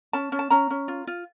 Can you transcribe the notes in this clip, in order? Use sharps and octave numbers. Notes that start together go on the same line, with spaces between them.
C#4 A5
C#4
A5
C#4 A#5
C#4
F4
F4